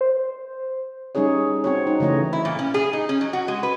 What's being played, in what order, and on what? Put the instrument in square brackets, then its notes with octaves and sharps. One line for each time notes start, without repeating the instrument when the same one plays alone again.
[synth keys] C5
[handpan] G3 C#4 D#4 G#4 C#5
C4 F#4 C#5
D#4
C#3 E3 A3 C#5 D#5
[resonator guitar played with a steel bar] E4
A#2
C#4
G#4
D#4
C#4
F#3
F#4
G#3
B4